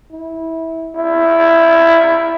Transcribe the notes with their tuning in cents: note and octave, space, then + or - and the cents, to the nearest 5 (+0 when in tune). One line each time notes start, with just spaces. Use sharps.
E4 -20
E4 +10